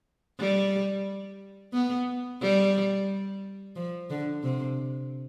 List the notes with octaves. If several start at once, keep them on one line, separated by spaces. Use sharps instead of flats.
G3
B3
G3
F3
D3
C3